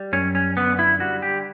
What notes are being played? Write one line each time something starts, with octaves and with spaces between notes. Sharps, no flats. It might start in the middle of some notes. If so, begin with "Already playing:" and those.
Already playing: G3
F#2 C#4
C#4
D3 B3
E4
G3 F#4
G4